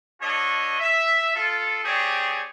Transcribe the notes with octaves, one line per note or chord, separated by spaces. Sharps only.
D4 F#4 A4 C#5 D#5
E5
F4 A4
C4 G4 G#4 C#5 D5